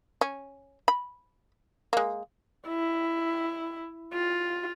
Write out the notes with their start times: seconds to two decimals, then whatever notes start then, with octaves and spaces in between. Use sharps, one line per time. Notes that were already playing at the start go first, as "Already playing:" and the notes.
0.21 C#4
0.88 B5
1.93 G#3 A#3
2.68 E4
4.13 F4